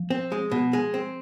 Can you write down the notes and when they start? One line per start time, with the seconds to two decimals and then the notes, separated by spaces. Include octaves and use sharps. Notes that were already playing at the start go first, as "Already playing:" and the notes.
Already playing: F3
0.10 C4
0.32 G#3
0.51 B2
0.73 G#3
0.94 C4